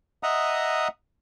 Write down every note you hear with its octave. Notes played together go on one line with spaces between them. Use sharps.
D#5 E5 F#5 A#5 D#6